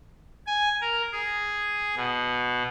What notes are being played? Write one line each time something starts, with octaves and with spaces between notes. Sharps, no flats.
G#5
A#4
G#4
B2